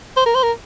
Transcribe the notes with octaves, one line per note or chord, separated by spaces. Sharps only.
C5
A#4
C5
A#4